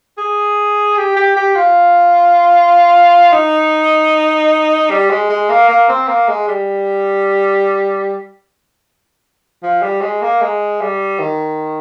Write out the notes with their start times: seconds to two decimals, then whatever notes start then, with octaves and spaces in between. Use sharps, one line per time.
0.18 G#4
0.97 G4
1.16 G4
1.36 G4
1.56 F4
3.33 D#4
4.90 G3
5.10 G#3
5.29 G#3
5.49 A#3
5.69 A#3
5.89 C4
6.08 A#3
6.28 G#3
6.48 G3
9.63 F3
9.82 G3
10.01 G#3
10.22 A#3
10.41 G#3
10.81 G3
11.20 D#3